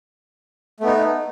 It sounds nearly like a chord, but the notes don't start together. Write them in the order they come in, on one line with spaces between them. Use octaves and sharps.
A3 B3 D#4